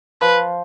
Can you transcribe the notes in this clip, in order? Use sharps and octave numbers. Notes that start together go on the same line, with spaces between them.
F3 B4